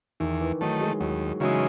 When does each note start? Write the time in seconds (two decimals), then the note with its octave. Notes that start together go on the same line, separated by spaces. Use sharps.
0.20 E2 D#3
0.41 E3
0.61 D#3 F#3 A3
0.81 G#3
1.00 D#2 F#3
1.40 C#3 E3 F#3 G#3 D#4